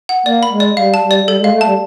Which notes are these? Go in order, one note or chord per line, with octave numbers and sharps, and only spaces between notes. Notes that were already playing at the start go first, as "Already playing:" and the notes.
F#5
A#3 D5
B5
G#3
D5
G3 F5
A5
G3
D5
G3 A4
G#3 F5
A3
G3 A5